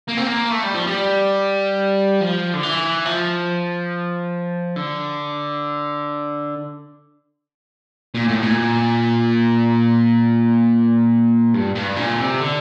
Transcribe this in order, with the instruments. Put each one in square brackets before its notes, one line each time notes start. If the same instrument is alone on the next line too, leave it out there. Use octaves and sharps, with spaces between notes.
[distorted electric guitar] A#3
C4
A#3
A3
G3
F3
G3
F3
D3
E3
F3
D3
A#2
A2
A#2
G2
G2
A#2
D3
C3
D3